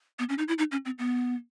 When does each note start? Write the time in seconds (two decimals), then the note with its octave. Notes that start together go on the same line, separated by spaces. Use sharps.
0.19 B3
0.29 C#4
0.38 D#4
0.48 E4
0.58 D#4
0.72 C#4
0.85 C4
0.99 B3